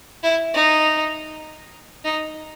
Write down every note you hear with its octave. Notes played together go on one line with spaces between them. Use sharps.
E4
D#4
D#4